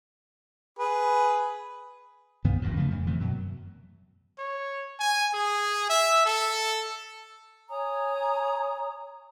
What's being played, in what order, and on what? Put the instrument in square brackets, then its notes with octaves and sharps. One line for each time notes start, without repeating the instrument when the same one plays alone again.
[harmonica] G#4 B4
[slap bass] C2 G2 D#3 B3
D#1 E2 G2 A#2
C#3 F3 A3
F2 A2
C3 D#3 E3 A3
F#2 B2 F#3
[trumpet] C#5
G#5
G#4
E5
A4
[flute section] C#5 G#5 A#5 D#6